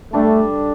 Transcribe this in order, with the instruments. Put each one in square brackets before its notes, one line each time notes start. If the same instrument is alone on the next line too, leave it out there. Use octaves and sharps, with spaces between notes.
[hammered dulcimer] G3 D4 A4 [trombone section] A3